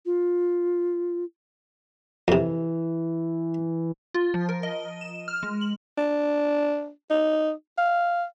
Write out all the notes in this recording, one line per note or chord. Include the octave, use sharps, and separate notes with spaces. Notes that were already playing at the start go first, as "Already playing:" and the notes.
F4
F2 C3 E3
F4
F3
A#4
D#5
E7
F6
G#3
F#7
D4
D#4
F5